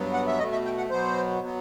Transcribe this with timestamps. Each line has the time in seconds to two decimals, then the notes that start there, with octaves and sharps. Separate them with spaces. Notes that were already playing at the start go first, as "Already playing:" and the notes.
Already playing: G2 F#3 B3
0.14 F#5
0.27 E5
0.39 B2 A3 D#5
0.52 E5
0.65 G5
0.77 F#5
0.90 B2 F#3 B3 C5
1.42 F#3 B3